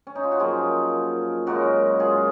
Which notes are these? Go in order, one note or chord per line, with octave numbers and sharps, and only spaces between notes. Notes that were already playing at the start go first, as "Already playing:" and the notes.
C#4
D#4
F4
F#4
F#2 F3 A#3 F4 G#4
F#2 C#3 G#3 F#4 A#4
F4 G#4